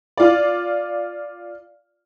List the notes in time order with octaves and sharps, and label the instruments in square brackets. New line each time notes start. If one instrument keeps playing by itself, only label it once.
[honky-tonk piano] F4 D5